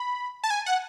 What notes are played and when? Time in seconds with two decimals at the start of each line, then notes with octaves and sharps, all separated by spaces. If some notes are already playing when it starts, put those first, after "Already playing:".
Already playing: B5
0.44 A5
0.50 G#5
0.66 F#5